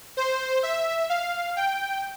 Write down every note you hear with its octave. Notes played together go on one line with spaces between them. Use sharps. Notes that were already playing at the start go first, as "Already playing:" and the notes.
C5
E5
F5
G5